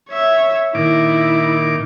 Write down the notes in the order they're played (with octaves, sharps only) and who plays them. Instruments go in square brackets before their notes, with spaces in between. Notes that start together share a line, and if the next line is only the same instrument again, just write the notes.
[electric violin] C#5 E5
[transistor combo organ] A#2 D#3 D6 [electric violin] E4